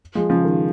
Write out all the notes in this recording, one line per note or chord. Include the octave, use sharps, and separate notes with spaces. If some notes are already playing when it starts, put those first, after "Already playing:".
F3 G#3
C#3 F3
D#3